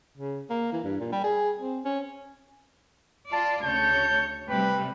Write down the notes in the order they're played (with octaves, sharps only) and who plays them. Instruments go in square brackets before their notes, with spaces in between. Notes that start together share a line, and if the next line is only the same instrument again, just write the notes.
[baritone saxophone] C#3
A#3
E3
G2
A#2
G3
G#4
C4
C#4
[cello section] F4 D5 [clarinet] A5
[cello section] D2 C#3 C#5 [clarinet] A5 [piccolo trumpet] G6
[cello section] C3 G3 A3 [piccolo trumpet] B4 [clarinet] G5